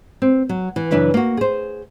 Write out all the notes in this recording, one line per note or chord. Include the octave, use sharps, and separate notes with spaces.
C4
F#3
E3
F#2 C#3 E3 D4 E4 B4
A#3 F#4
G#4 C5